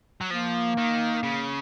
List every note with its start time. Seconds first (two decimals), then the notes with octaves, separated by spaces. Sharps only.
0.21 F#3
0.30 F3 A#3
0.78 D#3
1.23 C#3